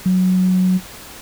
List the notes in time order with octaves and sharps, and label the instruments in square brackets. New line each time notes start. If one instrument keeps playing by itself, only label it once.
[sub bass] F#3